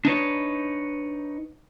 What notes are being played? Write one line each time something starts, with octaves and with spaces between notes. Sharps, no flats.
D4 D#4 B4 C#5